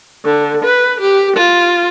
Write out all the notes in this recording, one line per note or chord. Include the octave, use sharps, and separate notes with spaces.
D3
B4
G4
F4